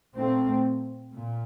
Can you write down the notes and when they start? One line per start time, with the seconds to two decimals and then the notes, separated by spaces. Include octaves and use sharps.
0.15 A#2 A3 C4
1.13 A#2